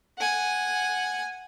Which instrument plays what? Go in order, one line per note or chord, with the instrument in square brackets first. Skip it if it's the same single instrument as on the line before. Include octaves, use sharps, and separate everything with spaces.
[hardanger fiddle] F#5 G#5